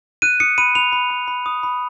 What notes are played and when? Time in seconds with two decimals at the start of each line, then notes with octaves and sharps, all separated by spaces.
0.22 F#6 D#7
0.40 D#6 C#7
0.58 B5 D#7
0.75 B5 F7
0.92 B5
1.10 B5
1.28 B5
1.46 D#6
1.63 B5